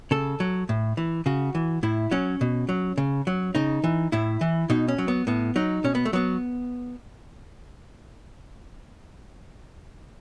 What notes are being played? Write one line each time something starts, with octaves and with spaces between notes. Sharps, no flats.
C#3 A4
F#3
A2
E3
C#3 F#4
E3
A2 E4
F#3 C#4
B2
F#3
C#3
F#3
C#3 D#4
E3
A2 E4
E3
B2 D#4
C#4
F#3
B3
A2 B3
F#3 D#4
B2 C#4
B3
A3
F#3 B3